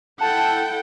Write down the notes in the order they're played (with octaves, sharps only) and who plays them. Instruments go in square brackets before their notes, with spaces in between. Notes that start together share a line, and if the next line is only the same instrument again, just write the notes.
[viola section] E4 A4 G5 [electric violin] F#5 [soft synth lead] A5